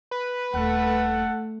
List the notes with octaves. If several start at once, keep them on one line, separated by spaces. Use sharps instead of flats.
B4
D#1 A3 A4 F#5